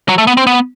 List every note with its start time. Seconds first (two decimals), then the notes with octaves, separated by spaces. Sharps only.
0.09 F#3
0.18 A3
0.27 B3
0.37 C4
0.47 B3